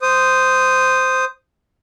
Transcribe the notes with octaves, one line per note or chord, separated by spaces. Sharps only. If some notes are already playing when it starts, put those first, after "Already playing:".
C5 D#6